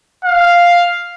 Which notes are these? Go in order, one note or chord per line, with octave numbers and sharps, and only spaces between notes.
F5